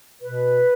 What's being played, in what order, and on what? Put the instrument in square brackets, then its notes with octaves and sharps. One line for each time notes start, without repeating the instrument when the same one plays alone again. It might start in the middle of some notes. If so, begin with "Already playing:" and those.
[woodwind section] B2 B4